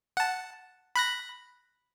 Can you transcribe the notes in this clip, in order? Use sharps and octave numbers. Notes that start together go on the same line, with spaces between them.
F#5 A5
B5 F#6 A#6